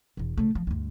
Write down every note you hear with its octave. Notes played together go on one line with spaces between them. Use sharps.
E1 E2
C#3 A3
F3
D2 G2